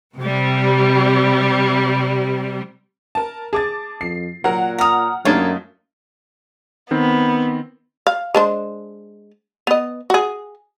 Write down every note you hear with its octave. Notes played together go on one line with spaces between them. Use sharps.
C3 G3
A#4 A5
G#4 A5 D6 A6
F2 C7
A#2 F#3 A#4 F#5
F#5 A#5 D#6 F6 F7
F#2 A3 A#3 D4 D#4 F4 C#5
D#3 B3 C4
F5
G#3 D4 C5
B3 D#5
F#4 G#4